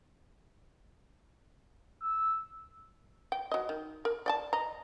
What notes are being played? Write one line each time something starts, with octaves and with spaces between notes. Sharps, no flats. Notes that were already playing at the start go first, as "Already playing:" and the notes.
E6
G5
F#3 D#5
D#3
A#4
D5 G5 A5
D#5 A#5